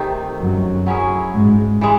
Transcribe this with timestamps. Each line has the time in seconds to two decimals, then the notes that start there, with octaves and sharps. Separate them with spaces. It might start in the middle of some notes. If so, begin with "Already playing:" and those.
Already playing: C3 D#3 A3 D#4
0.38 F#2 F#3
0.86 F#3 C#4 E4 G#4
1.33 G#2 G#3
1.81 E3 G#3